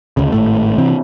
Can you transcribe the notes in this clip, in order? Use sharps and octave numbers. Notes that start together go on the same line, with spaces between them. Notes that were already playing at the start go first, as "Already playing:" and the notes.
D2 C#3
G#1 A2 A3
C3 E3 C4